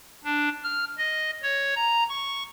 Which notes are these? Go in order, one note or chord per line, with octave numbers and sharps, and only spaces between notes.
D4
F6
D#5
C#5
A#5
C#6